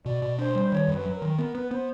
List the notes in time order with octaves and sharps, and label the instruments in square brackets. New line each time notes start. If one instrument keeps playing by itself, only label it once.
[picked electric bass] B2 [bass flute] D5
[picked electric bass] B2
[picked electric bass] D4 [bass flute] C5
[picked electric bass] G3
[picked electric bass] D#3 [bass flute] C#5
[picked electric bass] F#2
[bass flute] B4
[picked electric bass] F#3
[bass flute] A#4
[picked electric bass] D#3
[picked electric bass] B3 [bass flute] A#4
[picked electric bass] B3 [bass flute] B4
[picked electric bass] B3 [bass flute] C5